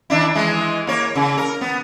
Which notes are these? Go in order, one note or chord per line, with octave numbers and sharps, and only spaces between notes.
D#3 D4 E4
E3 G#3
A#3 C#5
C#3
A#4
B3